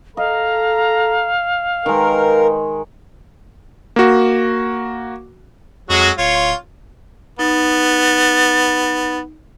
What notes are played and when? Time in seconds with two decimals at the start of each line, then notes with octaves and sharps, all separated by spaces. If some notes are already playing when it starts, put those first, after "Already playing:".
0.17 A4 D#5 F5 A#5
1.86 D#3 G#3 A#4 B4 G5
3.96 A#3 F#4
5.90 F2 F#3 G#3 F#4
6.18 D1 F4 C#5
7.39 B3 D#4 A6